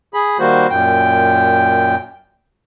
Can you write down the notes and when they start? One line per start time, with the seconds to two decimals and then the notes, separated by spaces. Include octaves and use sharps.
0.14 G#4 B5
0.39 D#3 G3 A#3 F#4 C5
0.70 F#2 A#2 G5